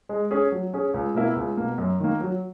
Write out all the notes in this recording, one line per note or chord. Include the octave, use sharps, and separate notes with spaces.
G#3
C#4 G#4
F#3
C#4 G#4
C#2
B2 A#3 E4 A#4
C#2
B2 A#3
F#2
D#3 A#3
F#3